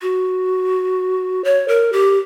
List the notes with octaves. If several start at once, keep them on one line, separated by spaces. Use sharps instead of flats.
F#4
C#5
A#4
G4